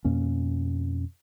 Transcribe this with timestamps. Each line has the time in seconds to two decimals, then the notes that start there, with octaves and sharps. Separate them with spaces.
0.05 F2 B2 A#3 C#4